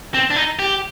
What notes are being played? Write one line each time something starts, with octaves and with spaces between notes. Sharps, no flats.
C4
D4
D#4
G4